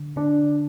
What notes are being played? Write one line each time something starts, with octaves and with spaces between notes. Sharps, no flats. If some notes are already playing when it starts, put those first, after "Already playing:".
Already playing: D3
D3 D4